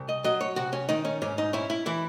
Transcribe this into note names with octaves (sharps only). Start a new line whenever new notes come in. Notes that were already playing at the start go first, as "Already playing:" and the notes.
Already playing: C2
D#5
F#3 D#5
C#5
C3 F#4
C#4
D#3 D#4
C#4
G#2 C#4
D#4
C#4 E4
E4
E3 E4